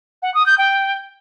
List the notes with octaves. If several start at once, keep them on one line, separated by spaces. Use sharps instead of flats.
F#5
D#6
G6
G5